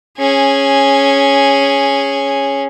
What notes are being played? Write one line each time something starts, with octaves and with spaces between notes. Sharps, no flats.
C#4 G#4